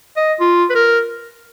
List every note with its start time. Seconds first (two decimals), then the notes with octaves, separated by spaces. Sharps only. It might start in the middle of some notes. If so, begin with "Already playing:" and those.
0.17 D#5
0.40 F4
0.70 B4
0.75 A#4